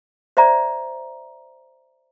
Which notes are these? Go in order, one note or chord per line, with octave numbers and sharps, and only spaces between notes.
C5 D5 E5 A#5